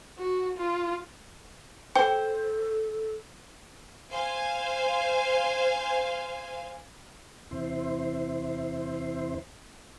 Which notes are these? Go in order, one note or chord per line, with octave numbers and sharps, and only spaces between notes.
F#4
F4
A4 C5 G5
C5 F5 G#5
E2 C3 E4 C5